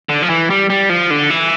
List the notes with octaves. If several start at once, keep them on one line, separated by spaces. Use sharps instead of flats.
D3
F3
E3
G3
G3
F3
D3
E3